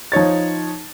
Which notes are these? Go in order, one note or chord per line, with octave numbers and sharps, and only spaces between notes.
F3 D#4 C#5 A6